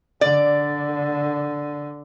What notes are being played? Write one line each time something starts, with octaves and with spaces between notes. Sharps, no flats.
D3 D5